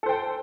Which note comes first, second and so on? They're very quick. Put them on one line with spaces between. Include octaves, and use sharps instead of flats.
A4 C5 G5